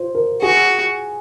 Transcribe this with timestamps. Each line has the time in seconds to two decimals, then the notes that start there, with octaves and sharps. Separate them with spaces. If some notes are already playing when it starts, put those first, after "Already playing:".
Already playing: F4 C5
0.15 A#4
0.42 F#4 G#4